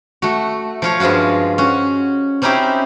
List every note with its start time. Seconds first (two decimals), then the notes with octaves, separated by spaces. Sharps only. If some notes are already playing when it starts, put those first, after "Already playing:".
0.22 A3 F#4
0.82 F3 F4 C#5
1.00 G2 F3 G#3 F4 F#4
1.58 C#4 F#4
2.42 C4 C#4 D#4 E4 G4 C5